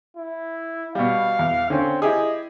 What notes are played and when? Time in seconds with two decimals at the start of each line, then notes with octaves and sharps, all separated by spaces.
0.17 E4
0.95 B2 G3 F5
1.39 E2
1.70 D3 C4 C#4
2.02 E4 G4 G#4 D#5